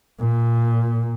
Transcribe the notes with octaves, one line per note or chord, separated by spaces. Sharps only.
A#2